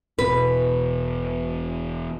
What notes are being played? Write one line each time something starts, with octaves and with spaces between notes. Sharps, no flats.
E1 B2 B4